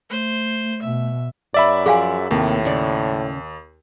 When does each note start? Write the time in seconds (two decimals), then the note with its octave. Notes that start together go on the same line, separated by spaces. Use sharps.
0.10 A3 C5
0.82 B2 E5
1.54 F#2 D5 E5 B5
1.86 F3 G#4 F5 G#5
2.31 D#2 A2 C3 A#3
2.65 C#3 D5